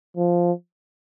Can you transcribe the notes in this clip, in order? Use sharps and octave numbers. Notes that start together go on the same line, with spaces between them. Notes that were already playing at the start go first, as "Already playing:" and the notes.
F3